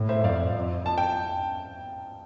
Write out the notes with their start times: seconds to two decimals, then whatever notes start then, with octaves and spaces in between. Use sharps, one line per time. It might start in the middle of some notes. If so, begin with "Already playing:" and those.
Already playing: A2
0.09 C5 E5
0.24 F2 D5 F5
0.55 F2
0.86 A5
0.98 G5